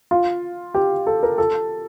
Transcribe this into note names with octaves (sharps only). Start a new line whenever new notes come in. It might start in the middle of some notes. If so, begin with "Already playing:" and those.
F4
G4
A4
A#4
A4